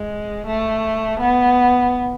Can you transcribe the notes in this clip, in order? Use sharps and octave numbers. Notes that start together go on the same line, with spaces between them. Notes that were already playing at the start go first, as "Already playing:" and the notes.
Already playing: G#3
A3
B3